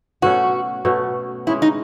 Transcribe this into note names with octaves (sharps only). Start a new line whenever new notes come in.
B2 A3 C#4 F#4
B2 A3 C#4
C#3 G#3 C#4 E4 G#4
D#4